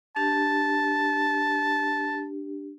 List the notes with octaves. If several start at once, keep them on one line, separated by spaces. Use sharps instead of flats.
D4 G4 A5